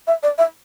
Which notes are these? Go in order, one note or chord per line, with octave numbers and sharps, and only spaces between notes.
E5
D5
E5